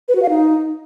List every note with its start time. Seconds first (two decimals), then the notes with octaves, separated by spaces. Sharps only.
0.08 B4
0.15 F#4
0.22 F5
0.29 D#4